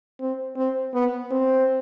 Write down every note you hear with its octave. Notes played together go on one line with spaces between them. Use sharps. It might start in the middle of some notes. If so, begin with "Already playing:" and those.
C4
C4
B3
C4